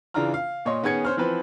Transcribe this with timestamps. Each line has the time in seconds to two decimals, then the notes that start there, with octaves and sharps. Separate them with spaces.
0.14 C#3 E3 D4 F4 A#5 F6
0.34 F5
0.65 A#2 C#5 D#5 C6
0.83 D#3 B3 C#4 G#4 G#6 C#7
1.05 C#4 C5 F6
1.17 E3 F3 C4 B4 C5